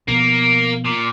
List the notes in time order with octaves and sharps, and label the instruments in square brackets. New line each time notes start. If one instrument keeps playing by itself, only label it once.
[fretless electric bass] B2 F3 B3 [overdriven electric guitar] A#3
[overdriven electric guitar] A#2